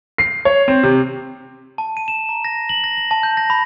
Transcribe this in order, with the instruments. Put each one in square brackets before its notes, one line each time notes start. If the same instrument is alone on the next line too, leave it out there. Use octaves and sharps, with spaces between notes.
[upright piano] C7
C#5
C4
C3
[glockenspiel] A5
D#7
E7
A#5
A#6
F#7
A#6
F#7
A5
G6
A#6
B5